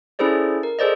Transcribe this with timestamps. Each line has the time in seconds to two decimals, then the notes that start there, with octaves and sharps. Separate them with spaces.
0.19 C#4 E4 G#4 A4 C5 D5
0.63 A#4
0.79 G#4 A4 C5 D5 D#5